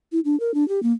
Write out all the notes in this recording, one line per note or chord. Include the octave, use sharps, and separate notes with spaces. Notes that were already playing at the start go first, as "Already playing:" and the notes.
E4
D4
A#4
D4
G4
A#3